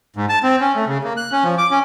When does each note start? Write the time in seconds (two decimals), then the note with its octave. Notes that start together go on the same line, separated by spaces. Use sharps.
0.16 G#2
0.29 A5
0.43 C4
0.61 C#4
0.76 A3
0.87 C#3
1.04 A#3
1.17 F#6
1.32 C#4
1.44 F3
1.58 D6
1.71 C#4